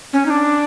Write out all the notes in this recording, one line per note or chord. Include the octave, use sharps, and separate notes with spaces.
C#4
D#4
D4